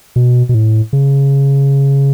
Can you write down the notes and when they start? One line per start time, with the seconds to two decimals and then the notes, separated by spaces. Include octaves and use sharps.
0.16 B2
0.49 B2
0.54 A2
0.93 C#3